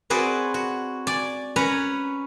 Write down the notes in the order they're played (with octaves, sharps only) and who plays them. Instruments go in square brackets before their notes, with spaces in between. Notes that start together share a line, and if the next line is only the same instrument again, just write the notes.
[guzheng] C4 F#4 G#4 B4 D5
F#4
D5 G#5
C#4 B4 C#5 A#5